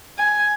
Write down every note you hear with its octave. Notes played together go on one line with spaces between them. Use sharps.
G#5